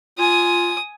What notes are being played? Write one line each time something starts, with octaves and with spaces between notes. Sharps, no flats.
F4 G#5 D#6